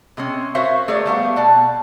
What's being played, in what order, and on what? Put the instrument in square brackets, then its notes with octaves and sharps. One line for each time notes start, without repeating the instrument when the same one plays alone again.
[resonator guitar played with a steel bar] C3 G#3 C4 C#4
F#4 A#4 C5 C#5 E5 F5
A3 G#4 A#4 C#5 D5
G3 A3 B3 F5
B2 D5 A5